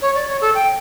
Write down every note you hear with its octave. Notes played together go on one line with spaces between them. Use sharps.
C#5
D5
C#5
A4
G5